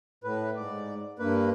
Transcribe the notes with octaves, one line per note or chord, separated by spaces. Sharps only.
A2 B4
G#2 D5
G2 A#3 B4